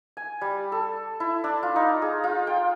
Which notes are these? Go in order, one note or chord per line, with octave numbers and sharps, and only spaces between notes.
G#5
G3
A4
E4
D4
F4
D#4
G#4
F4
G5